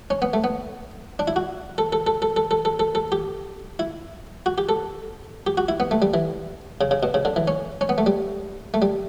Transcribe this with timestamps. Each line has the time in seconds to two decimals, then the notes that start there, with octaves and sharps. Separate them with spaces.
0.10 C#4
0.22 B3
0.33 A3
0.44 B3
1.19 D4
1.28 E4
1.36 F#4
1.78 A4
1.93 A4
2.07 A4
2.22 A4
2.36 A4
2.51 A4
2.65 A4
2.80 A4
2.95 A4
3.12 G4
3.79 E4
4.46 F#4
4.58 G4
4.69 A4
5.47 G4
5.57 F#4
5.69 E4
5.80 B3
5.91 A3
6.02 G3
6.14 E3
6.81 C#3
6.91 C#3
7.03 B2
7.14 C#3
7.25 D3
7.36 E3
7.48 C#4
7.81 C#4
7.89 B3
7.98 A3
8.06 G3
8.74 A3
8.82 G3